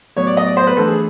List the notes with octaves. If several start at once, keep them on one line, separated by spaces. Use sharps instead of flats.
A2 F#3 B3 C#5
D5
D#5
D5
C5
B4
E3 A3 D4 A4
G#4